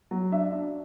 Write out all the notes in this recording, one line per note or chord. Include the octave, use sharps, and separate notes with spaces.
F#3
D4 E5
D4